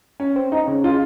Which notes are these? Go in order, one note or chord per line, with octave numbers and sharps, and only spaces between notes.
C#4
C4
D#4
C#3
F4